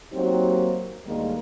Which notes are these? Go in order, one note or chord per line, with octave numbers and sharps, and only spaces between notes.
F#3 A#3 C4 D#4 G4 C5
D2 D#3 G3 G#3 A#3